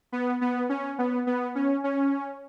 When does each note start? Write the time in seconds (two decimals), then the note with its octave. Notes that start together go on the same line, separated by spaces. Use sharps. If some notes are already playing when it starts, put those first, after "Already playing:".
0.12 B3
0.41 B3
0.69 C#4
0.99 B3
1.27 B3
1.55 C#4
1.84 C#4